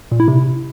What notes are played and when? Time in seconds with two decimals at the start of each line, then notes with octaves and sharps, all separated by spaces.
0.11 A#2
0.20 E4
0.28 C3